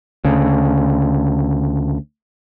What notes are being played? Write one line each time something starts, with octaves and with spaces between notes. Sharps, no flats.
D2 C#3